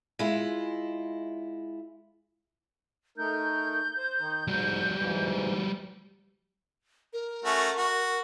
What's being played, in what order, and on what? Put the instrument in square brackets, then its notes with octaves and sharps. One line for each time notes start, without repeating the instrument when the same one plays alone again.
[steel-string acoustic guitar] G#3 E4 F4
[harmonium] A3 D#4 A#4 [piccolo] G6
[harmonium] C5
D#3 D#4
[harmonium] G#2 [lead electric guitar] G3 F#4
[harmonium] G#2 E3
[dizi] A#4
[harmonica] A3 C#4 F#4
F#4